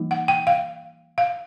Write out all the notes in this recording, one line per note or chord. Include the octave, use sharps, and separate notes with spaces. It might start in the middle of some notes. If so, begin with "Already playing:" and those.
Already playing: E3 G3 A#3 D#4
F#5
G5
F5
F5